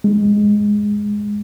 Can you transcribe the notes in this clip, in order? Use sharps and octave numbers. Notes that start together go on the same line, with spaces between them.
G#3